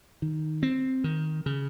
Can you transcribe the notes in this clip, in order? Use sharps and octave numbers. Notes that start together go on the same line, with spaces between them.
D#3
C4
D#3
C#3